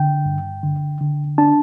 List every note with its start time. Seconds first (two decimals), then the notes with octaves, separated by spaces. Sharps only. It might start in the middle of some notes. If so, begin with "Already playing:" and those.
Already playing: D3 G5
0.25 G2
0.63 D3
1.01 D3
1.38 D4 A5